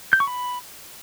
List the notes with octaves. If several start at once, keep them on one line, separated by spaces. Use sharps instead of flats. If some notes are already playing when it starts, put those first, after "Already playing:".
G6
C#6
B5